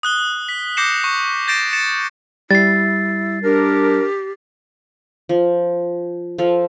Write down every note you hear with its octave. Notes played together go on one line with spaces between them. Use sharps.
D#6 F#6 G7
B6
D6 G6 A#6 C7 C#7 E7
C#6
G6 A6 A#6 C7 D7 E7
A6 C#7 E7
G3 E4 A6 C7
D4 G4 A#4
F3
F3 A4 F5